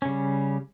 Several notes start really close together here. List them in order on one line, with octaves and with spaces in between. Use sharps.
C#4 C#3 G3